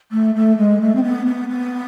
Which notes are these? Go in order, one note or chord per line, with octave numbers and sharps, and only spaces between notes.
A3
A3
G#3
A3
C4
B3
B3
B3